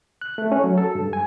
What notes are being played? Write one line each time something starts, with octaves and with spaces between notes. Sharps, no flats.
F#6
A3
C#4
F#3
A4
G2
G#5